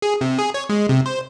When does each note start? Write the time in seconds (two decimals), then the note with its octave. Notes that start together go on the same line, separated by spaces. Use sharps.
0.02 G#4
0.21 C3
0.39 G#4
0.54 C#5
0.69 G#3
0.89 C3
1.06 C5